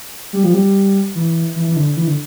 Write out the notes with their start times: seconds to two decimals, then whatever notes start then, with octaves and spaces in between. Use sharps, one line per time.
0.33 G3
0.44 F3
0.54 G3
1.15 E3
1.56 E3
1.67 E3
1.76 D3
1.97 E3
2.07 D3